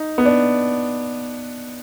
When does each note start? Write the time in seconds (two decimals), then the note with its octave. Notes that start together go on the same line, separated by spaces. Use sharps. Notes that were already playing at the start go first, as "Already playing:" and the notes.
Already playing: D#4
0.18 B3
0.25 D4